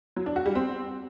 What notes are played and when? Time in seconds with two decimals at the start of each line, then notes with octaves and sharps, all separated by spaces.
0.16 F#3
0.26 D4
0.36 F#4
0.46 G3
0.55 C4